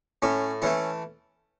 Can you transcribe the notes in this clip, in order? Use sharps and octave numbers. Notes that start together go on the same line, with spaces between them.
A2 C#4
E3 A3 C#4